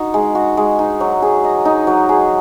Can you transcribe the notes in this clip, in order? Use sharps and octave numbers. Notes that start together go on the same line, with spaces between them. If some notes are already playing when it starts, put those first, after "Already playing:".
Already playing: D#4 F#4
G#3
F#4
G#3
D#4
F#3
G#4
D#5
D#4
F#3
G#4